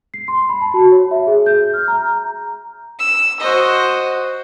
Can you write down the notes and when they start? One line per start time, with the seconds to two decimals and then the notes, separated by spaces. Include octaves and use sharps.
0.14 C7
0.28 C6
0.49 B5
0.61 A5
0.74 F#4
0.92 C#5
1.11 E5
1.27 G#4
1.46 G6
1.74 F6
1.88 A#5
2.97 E6
3.39 F#4 C5 D#5